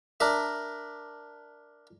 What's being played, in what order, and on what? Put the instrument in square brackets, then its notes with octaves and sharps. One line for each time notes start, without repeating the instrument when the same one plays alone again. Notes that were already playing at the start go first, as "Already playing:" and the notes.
[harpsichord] D4 A#4 E5